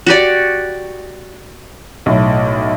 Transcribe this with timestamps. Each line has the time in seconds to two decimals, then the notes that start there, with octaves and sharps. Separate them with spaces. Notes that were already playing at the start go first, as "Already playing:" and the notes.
0.06 F#4 G4 D5
2.06 B1 A2